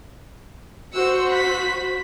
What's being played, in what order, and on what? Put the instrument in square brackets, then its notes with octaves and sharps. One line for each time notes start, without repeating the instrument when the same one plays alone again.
[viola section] F#4 C5 [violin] E6 C#7
[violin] B5 B6